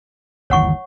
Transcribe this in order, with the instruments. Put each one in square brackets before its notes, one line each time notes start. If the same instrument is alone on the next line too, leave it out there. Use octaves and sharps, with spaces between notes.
[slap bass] G1 D#2 E3 [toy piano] C#5 F#5 C#6